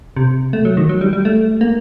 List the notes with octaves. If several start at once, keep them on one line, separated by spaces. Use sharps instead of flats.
C3
A3
F#3
D#3
F#3
G3
G3
A3
A#3